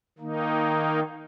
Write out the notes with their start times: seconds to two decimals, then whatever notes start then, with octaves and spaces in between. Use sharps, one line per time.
0.18 D#3 A#3 D#4